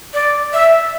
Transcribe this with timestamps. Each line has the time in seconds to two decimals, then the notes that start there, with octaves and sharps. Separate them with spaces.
0.14 D5
0.53 E5